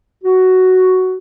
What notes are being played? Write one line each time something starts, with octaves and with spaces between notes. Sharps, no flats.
F#4